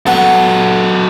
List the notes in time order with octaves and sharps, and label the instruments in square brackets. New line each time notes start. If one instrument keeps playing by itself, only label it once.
[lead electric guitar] F#3 A4 [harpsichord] B3